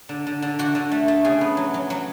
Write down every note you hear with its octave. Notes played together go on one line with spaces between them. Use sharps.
D3
D3
D3
D3 F#4
D3
A3
A3
C#3 G#4
B3
F#3
F#3
F#3